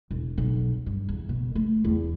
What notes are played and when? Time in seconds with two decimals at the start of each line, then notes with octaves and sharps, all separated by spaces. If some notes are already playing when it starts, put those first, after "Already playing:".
0.11 E1
0.38 B1
0.86 G2
1.09 E2
1.29 B2
1.55 A3
1.84 E2